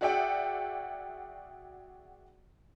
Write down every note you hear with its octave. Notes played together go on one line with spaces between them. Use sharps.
F#4 G#4 D5 E5 F#5 G5